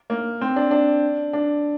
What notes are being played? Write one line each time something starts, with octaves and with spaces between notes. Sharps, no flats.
A#3
C4
D4
D4
D4